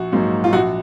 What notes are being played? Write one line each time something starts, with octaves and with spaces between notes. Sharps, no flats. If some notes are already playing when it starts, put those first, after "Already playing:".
Already playing: A#1 F#4
G#2 F#3 A#3
F4
A#1 F#4